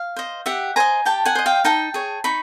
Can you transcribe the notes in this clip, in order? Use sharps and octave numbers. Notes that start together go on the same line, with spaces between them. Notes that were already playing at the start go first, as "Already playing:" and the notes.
Already playing: F5
C5 D#5
G4 E5 F#5
C5 D#5 G#5 A#5
G4 G5 A5
F#5 G#5
C5 D#5
F5 G5
D#4 G5 A5
G#4 C#5
D#4 B5 C#6